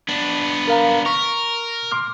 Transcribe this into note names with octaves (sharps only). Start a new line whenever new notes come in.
B3 D4
A#4 F5 A#5
A#4 C#6
C6 D6 F6